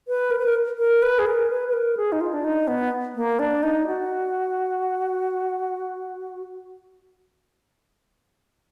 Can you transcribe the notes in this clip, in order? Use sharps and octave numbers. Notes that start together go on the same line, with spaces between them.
B4
A#4
B4
A#4
A#4
B4
G#4
A#4
B4
B4
A#4
G#4
D#4
F4
D4
D#4
B3
A#3
D4
D#4
F#4